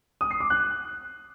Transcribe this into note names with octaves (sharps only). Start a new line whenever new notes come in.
D#6
C7
D6
F#6